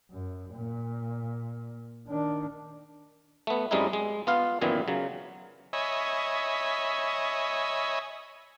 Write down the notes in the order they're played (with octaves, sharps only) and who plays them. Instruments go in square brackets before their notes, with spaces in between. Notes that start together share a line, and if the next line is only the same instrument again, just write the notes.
[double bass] F#2
A#2
D#3 D4
[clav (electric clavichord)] A3 B3
F#2 G3 G#3 C4 D#4 E4
G#3
B3 F4 F5
F#2 A#2 D#3 E3 B3
C#3 F#3
[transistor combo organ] C#5 D#5 E5 G#5 B5